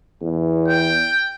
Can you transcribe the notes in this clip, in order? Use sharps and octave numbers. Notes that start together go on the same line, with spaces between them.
E2
G5